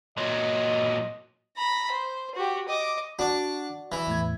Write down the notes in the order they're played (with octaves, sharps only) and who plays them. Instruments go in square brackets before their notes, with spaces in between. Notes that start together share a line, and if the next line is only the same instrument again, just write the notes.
[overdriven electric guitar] A#2 F#3 [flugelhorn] D#5
[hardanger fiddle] A#5 B5
C5
F#4 G4
D#5 D6
[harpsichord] D4 [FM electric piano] F#4 D5
[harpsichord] E3
[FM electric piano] E2 A2 G#6